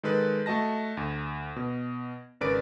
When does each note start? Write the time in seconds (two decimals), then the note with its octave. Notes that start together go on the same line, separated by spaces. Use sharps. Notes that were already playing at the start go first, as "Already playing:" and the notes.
0.03 D#3 G#3 A4 B4 F#6
0.46 A3 F#4 D#5 A5 A#6
0.97 D2
1.56 B2
2.41 G#1 C#3 A#4 B4 D5 D7